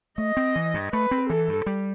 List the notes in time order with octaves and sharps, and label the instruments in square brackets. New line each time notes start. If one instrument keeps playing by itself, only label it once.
[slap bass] A3 [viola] D#5
[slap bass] C4
E3
G2
[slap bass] A3 [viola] B4
[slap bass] C4
[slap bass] E3 [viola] A4
[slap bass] G2
G3